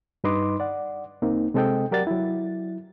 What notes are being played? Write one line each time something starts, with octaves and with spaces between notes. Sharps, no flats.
G2 D#4 B4 D#5 C6 D6
D5 F#5
C2 A#3 C4 D#4
C3 G#3 C4 A4 D#5 G5
F#3 G4 A#4 D5 F#5 A6
F#3 E4